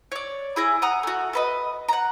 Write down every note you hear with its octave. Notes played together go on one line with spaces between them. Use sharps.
C#5 D5
E4 G#4 A#5
F#5 A#5 D#6
A3 F#4
A4 B4 D#5
F#5 A#5